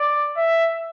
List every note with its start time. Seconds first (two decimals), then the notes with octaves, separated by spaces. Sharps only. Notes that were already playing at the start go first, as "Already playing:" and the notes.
Already playing: D5
0.36 E5